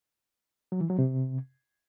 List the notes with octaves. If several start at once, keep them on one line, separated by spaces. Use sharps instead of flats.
F#3
E3
F#3
C3